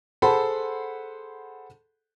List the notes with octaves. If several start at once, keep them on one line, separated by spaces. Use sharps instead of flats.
G#4 A4 C5 F#5 B5 C6